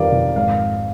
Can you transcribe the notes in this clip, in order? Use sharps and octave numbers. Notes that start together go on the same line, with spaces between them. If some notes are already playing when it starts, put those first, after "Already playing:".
Already playing: F2 D#3 G3 A#4 D5 F5
F2
G#2 F5